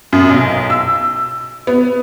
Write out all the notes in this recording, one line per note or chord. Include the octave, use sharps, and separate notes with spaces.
F#2
B1
E6
B3